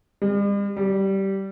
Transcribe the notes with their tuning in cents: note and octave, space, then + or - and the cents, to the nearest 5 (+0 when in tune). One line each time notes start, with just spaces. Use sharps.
G3 +45
G3 -15